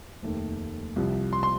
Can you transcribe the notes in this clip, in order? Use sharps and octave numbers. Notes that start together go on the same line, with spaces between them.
F1 D#2 D#3 A3
C2 C3 F3
C6
C6